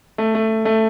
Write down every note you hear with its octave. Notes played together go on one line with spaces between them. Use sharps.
A3
A3
A3